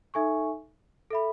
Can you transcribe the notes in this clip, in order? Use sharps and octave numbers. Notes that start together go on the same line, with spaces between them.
D#4 A4 E5 G#5 C#6
A4 E5 B5